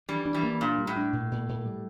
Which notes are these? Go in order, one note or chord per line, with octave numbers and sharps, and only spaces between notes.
E3 G3 D4
D4
E3 G3
A#3
A#2 D4
G3
A2
D4
A#2
A#2
A#2
G3